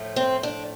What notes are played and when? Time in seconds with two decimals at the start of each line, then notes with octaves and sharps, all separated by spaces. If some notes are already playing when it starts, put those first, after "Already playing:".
Already playing: A2 F3 A3
0.16 C4
0.43 D4